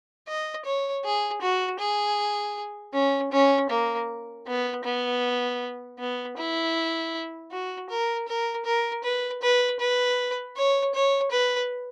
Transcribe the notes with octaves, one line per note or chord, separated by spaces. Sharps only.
D#5
C#5
G#4
F#4
G#4
C#4
C#4
A#3
B3
B3
B3
E4
F#4
A#4
A#4
A#4
B4
B4
B4
C#5
C#5
B4